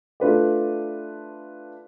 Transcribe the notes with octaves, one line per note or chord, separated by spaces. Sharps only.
A3 D4 F4 B4 D5